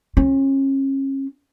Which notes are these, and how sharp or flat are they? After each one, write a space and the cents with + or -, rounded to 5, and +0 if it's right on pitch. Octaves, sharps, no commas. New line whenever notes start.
C#4 -35 F4 +0